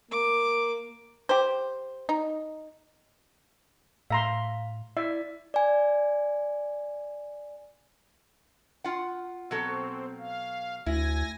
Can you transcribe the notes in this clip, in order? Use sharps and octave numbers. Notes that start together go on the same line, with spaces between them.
A#3 D6
G4 C5
D#4
A2 E5 F5 A#5 C6
E4 D5 E5
D5 G#5
F4 F#5
B2 F#3 C4 A4
F5
D2 E4 G#5 A#6